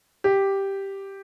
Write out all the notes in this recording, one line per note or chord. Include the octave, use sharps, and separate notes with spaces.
G4